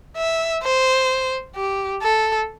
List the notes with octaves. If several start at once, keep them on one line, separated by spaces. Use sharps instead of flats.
E5
C5
G4
A4